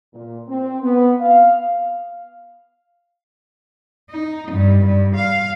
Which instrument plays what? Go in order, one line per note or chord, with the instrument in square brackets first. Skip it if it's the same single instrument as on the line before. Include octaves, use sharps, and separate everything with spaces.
[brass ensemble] A#2
C4
B3
F5
[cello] D#4
G2
G2
F5